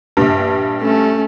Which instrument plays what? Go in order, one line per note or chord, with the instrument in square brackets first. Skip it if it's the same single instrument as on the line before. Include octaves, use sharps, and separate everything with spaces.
[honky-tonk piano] A#1 G2
[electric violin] A3 C#4